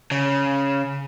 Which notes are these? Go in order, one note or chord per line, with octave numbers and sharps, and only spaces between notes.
C#3